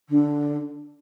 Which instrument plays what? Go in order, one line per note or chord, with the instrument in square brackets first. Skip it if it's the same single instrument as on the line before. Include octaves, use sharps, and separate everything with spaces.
[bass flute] D3